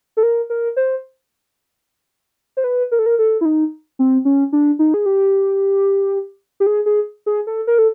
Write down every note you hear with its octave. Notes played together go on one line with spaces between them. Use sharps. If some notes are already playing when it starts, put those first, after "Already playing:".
A4
A#4
A#4
C5
C5
B4
A#4
A4
A#4
A4
E4
D#4
C4
C#4
D4
D#4
G#4
G4
G4
G#4
G#4
G#4
A4
A#4
A4